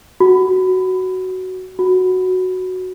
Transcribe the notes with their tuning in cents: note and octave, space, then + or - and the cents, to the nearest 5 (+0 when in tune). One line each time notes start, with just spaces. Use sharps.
F#4 +10
F#4 +0